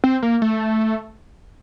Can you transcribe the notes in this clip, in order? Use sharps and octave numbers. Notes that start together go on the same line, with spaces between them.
C4
A#3
A3